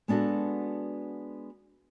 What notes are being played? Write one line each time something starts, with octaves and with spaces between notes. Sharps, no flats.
G#3 B3 D4 F#4 A4